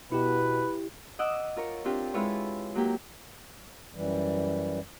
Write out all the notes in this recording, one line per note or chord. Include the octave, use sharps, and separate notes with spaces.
B2 E4 G4 B4
D#5 F#5 D6 E6
F4 A#4 C#5
C4 D4 F4 G4
G#3 E4 F4 B4 C#5
F#3 A#3 G4
F#2 E3 G3